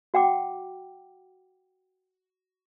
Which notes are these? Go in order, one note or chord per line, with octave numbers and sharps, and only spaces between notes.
F#4 F#5 G5 D6